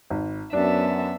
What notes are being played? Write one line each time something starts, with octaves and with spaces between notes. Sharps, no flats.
G#1
F#2 B3 D4 E5 A5